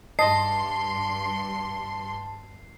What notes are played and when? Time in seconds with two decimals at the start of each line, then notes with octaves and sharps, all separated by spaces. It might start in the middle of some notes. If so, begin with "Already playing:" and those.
0.19 G2 D#5 A5 C6 C7